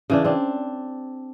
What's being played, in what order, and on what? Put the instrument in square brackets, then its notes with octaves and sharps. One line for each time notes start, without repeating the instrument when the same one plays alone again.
[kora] C#3 E3 D4
C4 D4